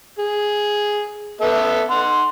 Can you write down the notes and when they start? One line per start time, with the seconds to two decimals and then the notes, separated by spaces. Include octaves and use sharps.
0.19 G#4
1.41 B3 A4 E5
1.90 F#5 C6